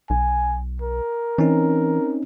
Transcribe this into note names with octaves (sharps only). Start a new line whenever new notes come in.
B1 G#5
A#4
E3 C4 C#4 D#4